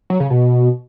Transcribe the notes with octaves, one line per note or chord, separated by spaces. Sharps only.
F#3
C#3
B2